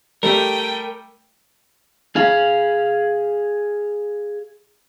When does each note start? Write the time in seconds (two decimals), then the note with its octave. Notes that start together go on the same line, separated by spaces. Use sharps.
0.23 G3 A3 A#4 G5 D#7
2.16 G#4 F5